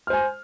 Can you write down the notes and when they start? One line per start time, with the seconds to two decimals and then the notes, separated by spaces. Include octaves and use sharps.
0.07 F6
0.10 C5
0.13 G#5